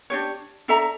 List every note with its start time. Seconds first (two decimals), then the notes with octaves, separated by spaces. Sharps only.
0.10 D4 G4 C#5
0.68 D4 A4 E5 A#5